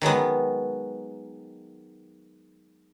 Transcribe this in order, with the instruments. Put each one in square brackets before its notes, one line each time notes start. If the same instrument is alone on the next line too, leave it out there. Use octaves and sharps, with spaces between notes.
[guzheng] D#3 F#3 G#3 B3